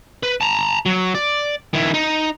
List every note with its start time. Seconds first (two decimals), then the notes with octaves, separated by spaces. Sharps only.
0.23 B4
0.41 A5 A#5
0.86 F#3
1.15 D5
1.73 D#3 E4
1.94 D#4